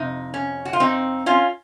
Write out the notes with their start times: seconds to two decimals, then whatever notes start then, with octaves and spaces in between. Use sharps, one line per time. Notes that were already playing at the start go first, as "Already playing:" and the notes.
Already playing: F2 C3 D#4
0.34 C#4
0.65 F#4
0.73 F4
0.80 C4 D#4
1.26 C#4 F4